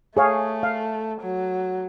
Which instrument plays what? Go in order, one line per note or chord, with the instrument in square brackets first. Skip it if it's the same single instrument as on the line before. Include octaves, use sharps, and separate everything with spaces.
[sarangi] A3 [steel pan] G#4 C#5 F5
[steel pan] F5
[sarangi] F#3